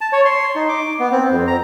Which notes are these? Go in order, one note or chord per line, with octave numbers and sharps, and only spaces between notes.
A5
C#5
C6
D#4
D6
B3
C4
F2
A#5